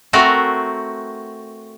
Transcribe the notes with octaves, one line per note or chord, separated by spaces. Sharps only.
A3 C4 F#4 A#4